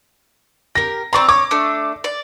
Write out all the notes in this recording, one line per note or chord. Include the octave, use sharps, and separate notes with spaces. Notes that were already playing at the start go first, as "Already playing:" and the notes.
G4 A#4 A#6
C4 D5 A#5 C6 C#6
C#5 D6
A3 D4
D5